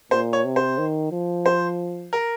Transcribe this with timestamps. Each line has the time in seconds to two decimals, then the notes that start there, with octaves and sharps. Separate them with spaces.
0.11 A#2 C5
0.33 C#5
0.45 C3
0.56 C5
0.78 D#3
1.12 F3
1.46 C5
2.13 A#4